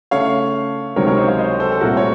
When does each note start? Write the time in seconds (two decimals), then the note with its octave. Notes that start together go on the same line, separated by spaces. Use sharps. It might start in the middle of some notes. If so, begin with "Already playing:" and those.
0.11 C#3 A3 C#4 C#5 F5
0.96 C#2 C3 D#3 F#3 C4 A#4 C#5
1.07 A#4 C#5
1.18 C5 D#5
1.28 C#5 F5
1.39 C5 D#5
1.60 A4 C5
1.72 A4
1.81 C2 A#2 A3 C4 F#4 A#4
1.97 C#5